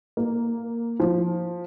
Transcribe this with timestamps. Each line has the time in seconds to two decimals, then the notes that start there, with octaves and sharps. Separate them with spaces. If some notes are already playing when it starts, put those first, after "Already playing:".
0.17 A#3
1.00 F3